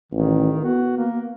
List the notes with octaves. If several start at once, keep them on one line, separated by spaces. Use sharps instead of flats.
A1 D#3
B3 F#4
A#3